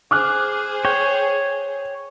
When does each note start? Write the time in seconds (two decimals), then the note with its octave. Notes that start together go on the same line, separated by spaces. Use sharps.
0.11 G#4 C5 D6 F6 F#6
0.85 C#5 G5